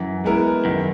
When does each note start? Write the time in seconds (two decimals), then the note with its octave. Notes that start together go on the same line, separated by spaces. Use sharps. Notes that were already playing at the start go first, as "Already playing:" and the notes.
Already playing: F#2 E3
0.24 G#3 B3 E4 A#4
0.65 F#2 D#3